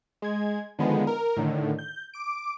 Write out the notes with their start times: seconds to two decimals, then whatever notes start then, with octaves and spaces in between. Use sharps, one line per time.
0.22 G#3 G#6
0.79 D3 D#3 F3 G#3 B3
1.07 A#4
1.37 A2 D3 D#3
1.79 G6
2.14 D6 D7